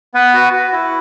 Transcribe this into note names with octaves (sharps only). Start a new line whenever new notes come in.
B3 B4
F#4
F#4
E4